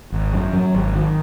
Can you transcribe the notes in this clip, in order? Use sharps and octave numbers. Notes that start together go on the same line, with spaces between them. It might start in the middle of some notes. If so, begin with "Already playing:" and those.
G#1
F#2
F#3
G#1
D#3